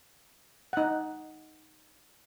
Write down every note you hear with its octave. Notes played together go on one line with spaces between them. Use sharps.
D#4 F#5